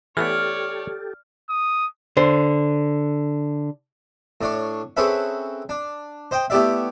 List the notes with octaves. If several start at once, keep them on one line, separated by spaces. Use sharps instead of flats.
E3 A3 B3 G4 A4 C#5 D5 F6
D#6
D3 C5
A2 D4 C#5
C4 C#4 G#4 A4 B4 E5
D4
C5 D#5 G5
A3 B3 E4 G4 D5 E5